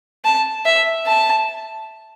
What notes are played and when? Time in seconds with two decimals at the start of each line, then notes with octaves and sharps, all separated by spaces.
0.25 A5
0.66 E5
1.07 A5